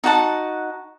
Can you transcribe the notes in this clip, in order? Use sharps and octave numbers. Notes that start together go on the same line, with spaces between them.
D#4 F#4 F#5 A5